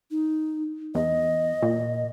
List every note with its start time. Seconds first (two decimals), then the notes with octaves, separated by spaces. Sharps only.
0.11 D#4
0.95 E2 D#5
1.62 A#2